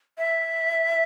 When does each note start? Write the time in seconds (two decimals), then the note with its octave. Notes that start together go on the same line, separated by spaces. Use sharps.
0.18 E5